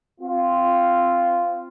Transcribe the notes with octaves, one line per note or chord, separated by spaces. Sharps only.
C4 F4